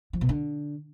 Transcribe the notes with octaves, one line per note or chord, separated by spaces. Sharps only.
F3
B2
D3